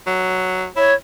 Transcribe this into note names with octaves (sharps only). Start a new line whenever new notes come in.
F#3
E4 C#5